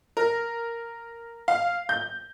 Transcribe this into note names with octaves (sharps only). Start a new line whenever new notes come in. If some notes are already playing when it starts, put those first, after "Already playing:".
A#4
F5
G6